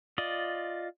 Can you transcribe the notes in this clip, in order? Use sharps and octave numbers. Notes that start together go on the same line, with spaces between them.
F4 D5 D#5